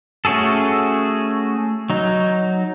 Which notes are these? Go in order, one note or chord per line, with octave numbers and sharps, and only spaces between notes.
A3 C#4 F#4 G#4 A4
F#3 D#4